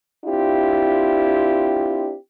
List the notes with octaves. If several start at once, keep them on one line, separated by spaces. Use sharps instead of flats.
C4 D4 E4 F4 G4